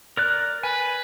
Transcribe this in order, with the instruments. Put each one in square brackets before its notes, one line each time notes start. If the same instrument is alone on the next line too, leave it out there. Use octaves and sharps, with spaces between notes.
[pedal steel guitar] A#4 D5 F#6
[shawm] B4 [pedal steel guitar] G#5